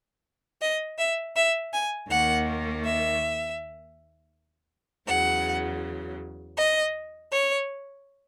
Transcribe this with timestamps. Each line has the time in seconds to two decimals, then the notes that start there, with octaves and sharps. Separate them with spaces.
0.61 D#5
0.98 E5
1.35 E5
1.73 G#5
2.10 D#2 D#3 A#3 F#5
2.84 E5
5.08 E2 C#3 F#3 F#5
6.57 D#5
7.31 C#5